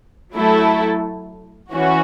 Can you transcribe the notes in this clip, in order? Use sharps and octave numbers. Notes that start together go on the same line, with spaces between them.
F#3 A3 E4 A4
E3 C#4 F#4